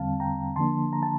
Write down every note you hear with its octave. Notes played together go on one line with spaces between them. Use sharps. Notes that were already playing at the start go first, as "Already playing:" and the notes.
Already playing: E2 D3 G3 C4 F5 A5
G5 A#5
D3 F3 A#3 D4 A5 C6
A#5
A5